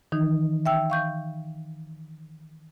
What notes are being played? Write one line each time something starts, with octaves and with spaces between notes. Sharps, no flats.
D#3 E3 D#4
E5 G5 E6
F5 C#6 G6